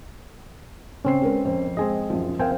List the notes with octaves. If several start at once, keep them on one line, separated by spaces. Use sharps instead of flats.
C#3 C4 C#4 C7
G#3 A#4 B4
F2 C5
G#3 C4 G#4 D#5
F#2 F3
C4 A#4 C5 F5 G5 G#5